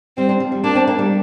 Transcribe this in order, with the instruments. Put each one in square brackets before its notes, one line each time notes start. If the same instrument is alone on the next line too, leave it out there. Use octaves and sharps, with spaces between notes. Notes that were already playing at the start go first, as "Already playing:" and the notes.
[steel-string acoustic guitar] G3 [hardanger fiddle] C4
[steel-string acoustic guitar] D4
F3
G3
[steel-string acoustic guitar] A#3 [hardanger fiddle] D4
[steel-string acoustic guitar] C4
A#3
G3